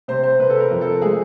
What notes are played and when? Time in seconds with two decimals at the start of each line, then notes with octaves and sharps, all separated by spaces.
0.08 C3 C5
0.23 C5
0.40 C3 B4
0.50 A4
0.60 A#4
0.71 F2
0.81 A4
1.02 G#3 G#4